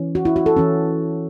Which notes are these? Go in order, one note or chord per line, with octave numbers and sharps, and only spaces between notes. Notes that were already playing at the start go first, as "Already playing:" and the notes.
Already playing: E3 C#4
F#4
E4
F#4
A4
E3 C#4